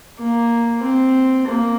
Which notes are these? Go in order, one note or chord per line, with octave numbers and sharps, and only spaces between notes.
A#3
C4
A#3